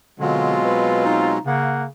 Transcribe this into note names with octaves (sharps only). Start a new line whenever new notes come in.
B2 D3 F#3 G#3 C4 F4
B4
D#4
C#3 A#3 F#5